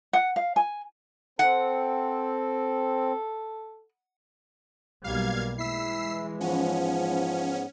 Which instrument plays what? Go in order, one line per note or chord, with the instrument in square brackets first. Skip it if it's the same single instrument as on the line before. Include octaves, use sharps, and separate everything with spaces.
[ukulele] F#5
F5
G#5
[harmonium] C4 [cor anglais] A4 [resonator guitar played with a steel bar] F#5
[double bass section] B1 G3 A#3 [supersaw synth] F5 G#6
[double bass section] E3 G#3 [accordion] E4 [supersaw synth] E6 B6 C7
[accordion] G#2 B3 [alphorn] F3 [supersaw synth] C#4